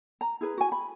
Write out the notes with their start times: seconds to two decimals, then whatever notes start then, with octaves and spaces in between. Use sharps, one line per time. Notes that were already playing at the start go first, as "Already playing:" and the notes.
0.21 A#5
0.41 E4 G#4 B4
0.58 F#4 G#5
0.72 B5